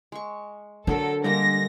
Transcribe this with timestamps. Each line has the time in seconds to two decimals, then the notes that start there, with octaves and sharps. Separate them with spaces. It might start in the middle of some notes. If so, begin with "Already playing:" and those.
0.12 G#3 C#6
0.87 D3 F#3 D4 A4 A#4
1.24 D3 G3 G#3 A#3 A#6